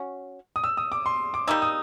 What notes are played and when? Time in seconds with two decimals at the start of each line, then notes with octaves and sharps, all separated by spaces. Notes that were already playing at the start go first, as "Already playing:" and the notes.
Already playing: C#4 F#4
0.56 D#6
0.64 E6
0.77 D#6
0.92 D6
1.06 C6
1.34 D6
1.47 G3 A#3 D#4 E6
1.62 D#6